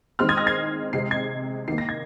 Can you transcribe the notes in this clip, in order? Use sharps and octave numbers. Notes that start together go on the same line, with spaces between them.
D#3 G#3 C4 C6 F6
D#6 G#6
F6 A#6
G#6 C7
C3 G#3 C4 C7
G#6 C7
D#3 A#3 C7
A#6
G#6